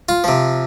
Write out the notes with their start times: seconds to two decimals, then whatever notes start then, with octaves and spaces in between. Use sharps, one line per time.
0.09 F4
0.24 C3 F3